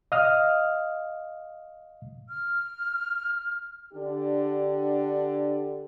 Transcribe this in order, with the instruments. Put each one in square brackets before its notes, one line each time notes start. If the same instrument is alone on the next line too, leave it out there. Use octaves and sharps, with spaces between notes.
[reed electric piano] D#5 F5 D#6 F6
[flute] F6
[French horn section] D3 D4 G4